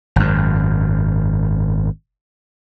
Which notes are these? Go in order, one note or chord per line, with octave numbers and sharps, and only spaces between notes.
G#1 F#2